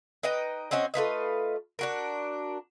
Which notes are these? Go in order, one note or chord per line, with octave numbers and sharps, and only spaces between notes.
D#4 B4 D#5 G5
C4 C#4 F#4 D#5
A3 F4 B4 D#5
D4 F#4 A#4